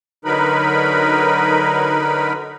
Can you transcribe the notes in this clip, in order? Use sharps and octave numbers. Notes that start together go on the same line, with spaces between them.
D3 F#3 D#4 A#4 B4 B5